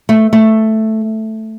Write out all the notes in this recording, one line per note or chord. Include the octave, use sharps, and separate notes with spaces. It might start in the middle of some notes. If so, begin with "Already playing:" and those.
A3
A3